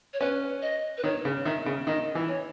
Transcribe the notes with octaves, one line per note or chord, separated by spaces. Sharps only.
C#5
C#4 B4
D#5
B4
D#3 C#5
C#3
D#3 E5
C#3
D#3 D#5
E3
C#5